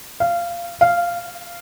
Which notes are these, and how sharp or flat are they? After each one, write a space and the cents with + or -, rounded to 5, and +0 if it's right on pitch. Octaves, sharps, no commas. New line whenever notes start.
F5 -20
F5 -10